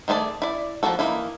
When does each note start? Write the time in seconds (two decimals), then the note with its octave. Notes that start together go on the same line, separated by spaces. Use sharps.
0.08 D#3 A3 G#4 D5 A5
0.42 E4 D5
0.83 F3 G#3 A#3 F#4 A4
0.99 E3 A#3 D#4 E4